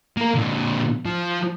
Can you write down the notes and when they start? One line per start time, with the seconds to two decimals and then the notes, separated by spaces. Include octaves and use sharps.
0.17 A#3 A#4
0.34 A#2 D3
1.05 F3